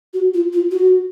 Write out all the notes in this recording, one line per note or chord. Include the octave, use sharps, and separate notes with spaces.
F#4
F4
F4
F#4